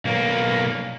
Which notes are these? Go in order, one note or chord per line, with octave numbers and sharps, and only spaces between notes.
B1 A#3